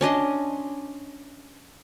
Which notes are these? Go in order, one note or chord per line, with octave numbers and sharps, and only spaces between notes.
C#4 D4 D#5 C6